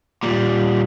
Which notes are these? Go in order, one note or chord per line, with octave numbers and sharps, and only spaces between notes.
A#2 G3